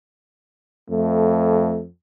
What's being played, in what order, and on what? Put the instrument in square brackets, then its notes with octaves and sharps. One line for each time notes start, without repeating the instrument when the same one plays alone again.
[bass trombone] F2 [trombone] A3